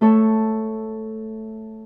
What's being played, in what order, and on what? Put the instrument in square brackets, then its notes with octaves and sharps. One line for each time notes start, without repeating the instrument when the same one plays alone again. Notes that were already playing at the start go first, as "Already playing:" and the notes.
[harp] A3 A4 C#5